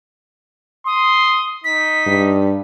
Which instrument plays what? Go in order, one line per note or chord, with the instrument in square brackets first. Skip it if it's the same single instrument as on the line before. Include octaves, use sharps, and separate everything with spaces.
[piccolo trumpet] C6 [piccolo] D#6
[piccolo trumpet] D#4 [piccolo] B6
[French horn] G2